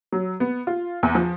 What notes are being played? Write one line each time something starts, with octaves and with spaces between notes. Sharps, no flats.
F#3
B3
F4
E2
F3